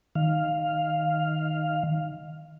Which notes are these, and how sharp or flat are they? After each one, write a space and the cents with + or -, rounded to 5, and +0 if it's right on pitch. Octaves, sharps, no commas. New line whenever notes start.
D#3 +0 F5 +0